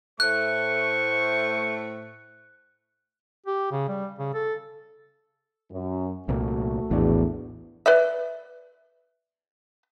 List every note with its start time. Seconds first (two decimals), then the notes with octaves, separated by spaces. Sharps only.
0.20 A2 A3 C5 C#6 F#6
3.46 G4
3.72 C#3
3.89 G3
4.19 C#3
4.34 A4
5.71 F#2
6.29 C2 A#2 A3 F#4
6.91 A#1 E2 A2 D4
7.86 B4 D5 E5